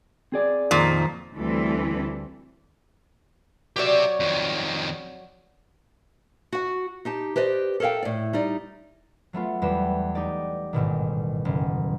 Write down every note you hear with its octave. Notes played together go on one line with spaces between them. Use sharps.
C4 G#4 D5
F2 A#2 D#3
D2 E3 G3 C4 A4
F#3 G4 C#5 D5 E5
F2 D#3
F#4 F#5
D#4 G4 A5
G4 B4 C5 D5 D#5
A4 A#4 C#5 F5 G5
A2 D5
G3 D#4 D5
F#3 A3 B3 F4
E2 G3 B4 E7
D#4 G4 D5
A1 G#2 B2 D#3
F#1